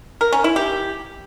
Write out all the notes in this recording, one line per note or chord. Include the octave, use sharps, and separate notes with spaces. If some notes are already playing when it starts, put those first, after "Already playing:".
A#4
C#4
E4
G4